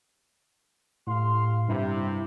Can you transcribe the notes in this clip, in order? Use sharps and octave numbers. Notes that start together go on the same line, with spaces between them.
A2 G4 F5 C6
G2 C3 E4